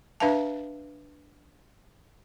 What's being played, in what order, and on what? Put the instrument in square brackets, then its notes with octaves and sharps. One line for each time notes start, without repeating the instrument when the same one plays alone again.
[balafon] D4 B4 E5 F5 A5